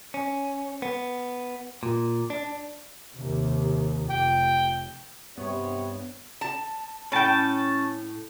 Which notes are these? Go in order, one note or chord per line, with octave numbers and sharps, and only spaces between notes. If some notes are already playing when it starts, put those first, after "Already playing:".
C#4
B3
A#2
D4
D#2 C3
F1 G5
G2 C3 B3 C#5
A5
A2 C#4 G5 A5